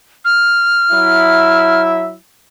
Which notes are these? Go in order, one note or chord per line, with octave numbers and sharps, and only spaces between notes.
F6
F#3 E4 E5